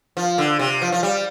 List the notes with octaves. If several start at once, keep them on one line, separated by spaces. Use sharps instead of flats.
F3
D3
C3
F3
F3
G3